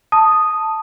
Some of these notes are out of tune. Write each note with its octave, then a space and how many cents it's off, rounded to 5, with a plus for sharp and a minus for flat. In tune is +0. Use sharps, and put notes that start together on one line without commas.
A5 +0 D#6 +0